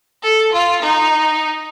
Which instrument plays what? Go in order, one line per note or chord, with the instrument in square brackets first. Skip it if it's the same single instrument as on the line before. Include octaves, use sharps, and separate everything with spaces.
[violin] A4
F4
D#4